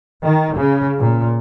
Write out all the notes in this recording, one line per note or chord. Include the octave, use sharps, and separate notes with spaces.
D#3
C#3
A#2